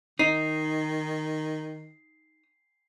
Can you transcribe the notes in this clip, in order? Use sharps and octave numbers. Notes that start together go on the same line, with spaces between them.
D#3 D#4 C7